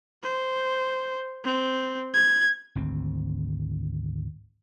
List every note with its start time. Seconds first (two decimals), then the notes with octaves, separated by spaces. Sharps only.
0.23 C5
1.44 C4
2.14 G#6
2.75 G#1 D2 C4